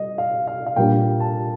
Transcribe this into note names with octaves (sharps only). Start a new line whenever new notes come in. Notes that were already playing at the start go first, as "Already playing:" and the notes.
Already playing: G3 D#5
F5
F5
F5
A#2 G3 A#3 D4 G5
A5